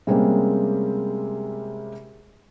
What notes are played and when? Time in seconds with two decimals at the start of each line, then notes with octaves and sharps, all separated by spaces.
0.07 C3 G3 G#3 A#3 C4 C#4